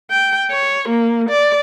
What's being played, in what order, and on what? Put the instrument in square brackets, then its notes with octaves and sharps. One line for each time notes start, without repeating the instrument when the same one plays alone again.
[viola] G5
C#5
A#3
D5